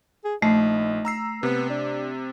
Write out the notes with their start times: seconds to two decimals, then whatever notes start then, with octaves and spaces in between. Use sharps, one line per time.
0.25 G#4
0.42 A#1 A3 D#4
1.05 A#5 E6 C7
1.43 C3 B3
1.70 D4